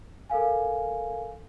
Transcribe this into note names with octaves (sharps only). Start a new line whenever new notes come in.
A4 A#4 F5 G#5